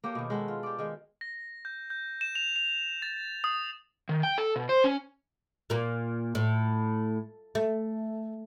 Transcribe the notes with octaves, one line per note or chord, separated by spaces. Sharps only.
A#3 G4 A4 C#5
B2 D#3
G#3 F#4 A4
F4
G4 D5
D#3 G#3
A#6
G6
G6
E7
F7
F7
A6
D#6
D#3
G5
A4
B2
C5
C#4
A#2 A#3
A2
A3